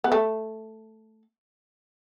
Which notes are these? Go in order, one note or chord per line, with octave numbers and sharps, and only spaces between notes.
B3
A3